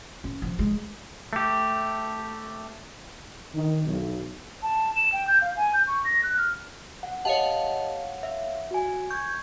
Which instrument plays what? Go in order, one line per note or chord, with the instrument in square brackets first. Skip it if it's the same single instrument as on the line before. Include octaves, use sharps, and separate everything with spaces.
[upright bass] C#4
F3
G#3
[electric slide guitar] A3 G4
[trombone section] D#3
B1
[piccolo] A5
E7
G5
G6
F5
G#5
G6
C#6
A#6
F#6
F6
[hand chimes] F#5
[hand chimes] G4 D#5 A5 [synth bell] C#5 F5 F#5
[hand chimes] E5
F#4 G#5
[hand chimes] C#6 G#6 [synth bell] G6